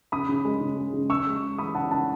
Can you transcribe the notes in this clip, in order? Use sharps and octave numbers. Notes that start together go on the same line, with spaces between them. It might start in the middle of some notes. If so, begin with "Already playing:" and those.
C#3 B5 D#6
C#3
G#3
C#3
G#3
C#3
C#3 C#6 E6
G#3
G#3
E3 B5 D#6
C#3 F#5 A5
C#3 F#5 A5